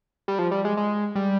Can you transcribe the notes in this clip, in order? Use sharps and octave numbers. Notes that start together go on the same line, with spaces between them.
G3
F3
G3
G#3
G#3
G3